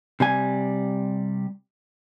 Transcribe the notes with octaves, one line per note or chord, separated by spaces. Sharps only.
C3 G3 G#5